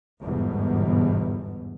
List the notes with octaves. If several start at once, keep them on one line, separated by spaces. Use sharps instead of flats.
G1 E2 G#2 B2